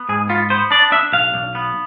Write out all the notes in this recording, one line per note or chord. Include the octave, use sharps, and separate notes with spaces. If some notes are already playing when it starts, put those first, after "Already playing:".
Already playing: B3
G#2 G#4
B3 F4
B3 C5
D4 D5
D4 E5
B1 F5
B1
B3